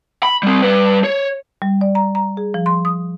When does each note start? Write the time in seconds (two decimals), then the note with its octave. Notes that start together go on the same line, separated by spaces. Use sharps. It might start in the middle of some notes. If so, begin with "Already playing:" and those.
0.23 B5
0.43 G3 C4
0.63 G3 B4
1.04 C#5
1.62 G3
1.81 D5
1.95 A#5
2.15 A#5
2.37 G#4
2.54 F3
2.66 C6
2.85 D#6